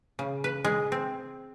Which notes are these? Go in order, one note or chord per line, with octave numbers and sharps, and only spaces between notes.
C#3
B4
G#3
C4